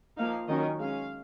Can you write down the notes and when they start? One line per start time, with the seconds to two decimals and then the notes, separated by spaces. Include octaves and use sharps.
0.17 F3 A#3 D#4 F5
0.48 D#3 F#3 C#4 D#5
0.79 G#3 C#4 F5